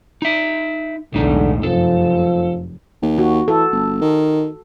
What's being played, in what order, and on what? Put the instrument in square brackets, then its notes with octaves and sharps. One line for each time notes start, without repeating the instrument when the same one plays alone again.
[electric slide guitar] D#4 E5
[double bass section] B1 E2 G#3 [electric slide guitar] A2 D#4 [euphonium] D3
[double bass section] F1 F#2 [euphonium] F3 [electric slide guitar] A4
[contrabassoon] D#2
[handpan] F#4
[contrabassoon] E3 [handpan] A4
[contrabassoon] G1
D#3